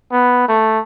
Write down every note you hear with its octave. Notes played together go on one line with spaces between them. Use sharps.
B3
A3